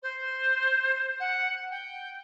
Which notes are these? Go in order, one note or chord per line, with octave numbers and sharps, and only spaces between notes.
C5
F#5
G5